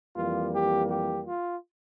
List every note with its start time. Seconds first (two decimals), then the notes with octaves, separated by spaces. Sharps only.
0.16 F2 E3 G3 A#3 F4
0.54 G4
0.89 G4
1.26 F4